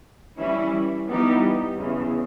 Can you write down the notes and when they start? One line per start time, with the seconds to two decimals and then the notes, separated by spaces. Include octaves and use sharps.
0.37 E3 G3 C#4 E4
1.07 E3 G3 B3 D#4 G4
1.76 E2 C#3 E3